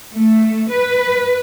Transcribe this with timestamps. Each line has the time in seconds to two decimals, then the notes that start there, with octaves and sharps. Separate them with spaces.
0.16 A3
0.71 B4